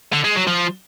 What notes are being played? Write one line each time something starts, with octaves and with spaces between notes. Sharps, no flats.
D3
G#3
F#3
F3